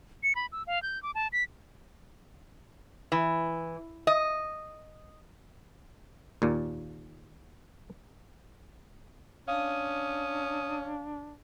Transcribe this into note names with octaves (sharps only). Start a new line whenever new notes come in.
C#7
B5
E6
F5
G6
D6
A5
B6
E3
D#5
D#2 A#2 A#3
C#4 D4 F5 D#6